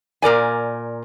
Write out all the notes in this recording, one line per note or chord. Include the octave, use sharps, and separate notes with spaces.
A#2 A#4 D5 G#5